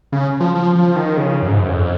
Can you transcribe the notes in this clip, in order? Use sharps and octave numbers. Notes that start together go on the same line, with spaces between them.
C#3
F3
F3
F3
D#3
C#3
F#2
G#2
F#2
F2